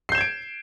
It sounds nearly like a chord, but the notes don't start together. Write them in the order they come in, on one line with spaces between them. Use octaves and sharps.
C7 G6 E7 G#6 D7